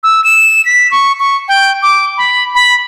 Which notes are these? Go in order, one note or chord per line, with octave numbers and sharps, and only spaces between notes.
E6
E7
B6
C#6
C#6
G5
D6
B5
B5